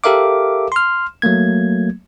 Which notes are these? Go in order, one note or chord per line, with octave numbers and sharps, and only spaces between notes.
G4 A4 A#4 E5 F5 D6
C6 F6
F#3 A3 A#3 G#6